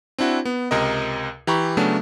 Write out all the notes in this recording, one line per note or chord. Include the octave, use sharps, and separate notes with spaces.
C4 D4 E4 F#4
B3
C#2 C3 A#4 D#5
E3 G4 A#5 B5 C#6
C#3 F#3 A3 B3 C#4 D4